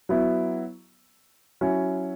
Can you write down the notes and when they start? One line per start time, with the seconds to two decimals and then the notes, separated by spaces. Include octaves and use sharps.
0.09 F#3 B3 E4
1.61 F#3 C#4 E4